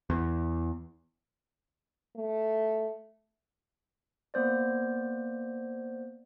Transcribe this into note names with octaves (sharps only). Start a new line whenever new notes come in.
E2
A3
A#3 B3 C5 D5